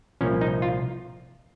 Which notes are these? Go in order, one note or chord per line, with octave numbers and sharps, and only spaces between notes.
C2 A#2 F3 C#4
D#4
F4